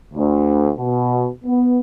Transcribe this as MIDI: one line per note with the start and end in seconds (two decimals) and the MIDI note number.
0.14 0.70 38
0.78 1.27 47
1.44 1.80 59